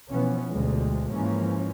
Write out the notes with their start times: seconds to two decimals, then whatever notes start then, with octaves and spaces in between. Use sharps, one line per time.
0.11 B2 E3 F3 B3 C#4
0.53 D2 B2 F3 G#3
1.11 G#2 E3 F3 G#3 A#3 C#4